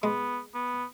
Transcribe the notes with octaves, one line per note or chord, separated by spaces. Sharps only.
G#3 B3
B3